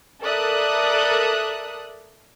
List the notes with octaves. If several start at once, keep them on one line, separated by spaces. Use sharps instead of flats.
A4 A#4 D5 E5 D#6 F#6